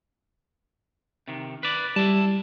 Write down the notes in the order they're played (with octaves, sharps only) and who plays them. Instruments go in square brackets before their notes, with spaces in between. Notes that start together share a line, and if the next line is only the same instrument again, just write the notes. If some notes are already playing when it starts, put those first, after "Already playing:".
[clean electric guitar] C3 D#3
B4 D5
[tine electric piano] G3 [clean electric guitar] E4 A5